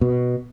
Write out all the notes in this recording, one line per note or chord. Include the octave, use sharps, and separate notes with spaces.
B2